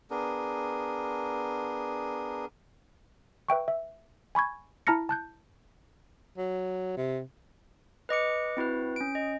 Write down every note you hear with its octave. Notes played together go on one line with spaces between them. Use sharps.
B3 D4 G#4 A#4
B4 E5 G5 C#6
E5
G#5 B5 C#6 G#6
E4 A5 A#5 F6 A#6 C#7
A5 F#6 G6
F#3
C3
B4 D#5 D6 C#7
C4 E4 F#4 B4
C#4 D7
D#5